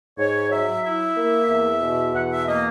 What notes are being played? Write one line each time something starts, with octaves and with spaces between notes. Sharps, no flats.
G#2 C#5
F#3 E5
E4 E5
A#3
E2
B2
E2 F#5
E5
A#3 D#5